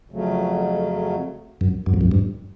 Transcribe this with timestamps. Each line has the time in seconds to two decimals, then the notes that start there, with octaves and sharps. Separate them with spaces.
0.10 F2 C#3 F#3 A3
1.61 F#2
1.86 F#2
1.94 F2
2.01 F#2
2.11 G2